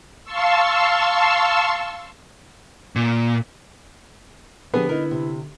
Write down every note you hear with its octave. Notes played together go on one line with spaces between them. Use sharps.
F5 A5 C6 C#6 E6
A#2
D3 F3 F#3 B3 G4 G#4
D#4 E4 A#4
C3